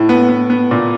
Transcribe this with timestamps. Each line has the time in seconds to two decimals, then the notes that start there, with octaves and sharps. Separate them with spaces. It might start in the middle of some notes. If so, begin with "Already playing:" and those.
Already playing: A2
0.09 B3
0.29 B3
0.50 B3
0.71 A#2